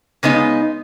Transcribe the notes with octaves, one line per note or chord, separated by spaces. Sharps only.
C#3 G#3 B3 D#4